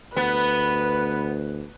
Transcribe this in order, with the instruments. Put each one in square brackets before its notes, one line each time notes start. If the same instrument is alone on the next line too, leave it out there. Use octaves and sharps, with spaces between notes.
[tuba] D2 [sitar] B3 [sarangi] B4